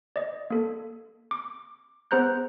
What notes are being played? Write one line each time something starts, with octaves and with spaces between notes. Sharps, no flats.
D5 D#5
A#3 A4
D6
B3 G#4 C5 A#5 F#6 G6